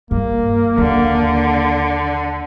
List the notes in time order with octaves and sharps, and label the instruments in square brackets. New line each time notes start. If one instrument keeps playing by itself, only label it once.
[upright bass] G2 [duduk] A#3
[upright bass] D#2 [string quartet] D3